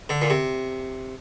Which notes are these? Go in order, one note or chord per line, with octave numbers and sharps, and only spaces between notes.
D3
A#2
C3